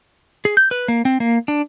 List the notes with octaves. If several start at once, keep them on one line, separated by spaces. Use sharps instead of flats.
G#4
G6
B4
A#3
C4
A#3
D4